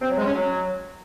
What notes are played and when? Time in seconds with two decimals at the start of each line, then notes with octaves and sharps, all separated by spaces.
0.02 C4
0.10 F#3
0.18 G#3
0.25 C#4
0.33 F#3